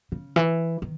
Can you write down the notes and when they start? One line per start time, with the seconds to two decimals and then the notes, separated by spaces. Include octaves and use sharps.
0.12 C#3
0.36 E3
0.82 D#3